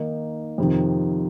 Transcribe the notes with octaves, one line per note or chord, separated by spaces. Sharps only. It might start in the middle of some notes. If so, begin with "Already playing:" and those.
Already playing: D#3 A#3 D#4
F2 C3 D#3